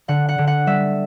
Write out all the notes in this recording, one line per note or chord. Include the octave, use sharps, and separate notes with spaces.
D3 F#5
F#5
D3
F#5
G3 E5